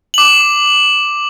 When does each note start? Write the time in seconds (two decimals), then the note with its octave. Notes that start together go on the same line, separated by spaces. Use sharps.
0.14 D6 F#7